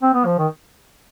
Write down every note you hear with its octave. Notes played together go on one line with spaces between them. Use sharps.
C4
B3
F3
D#3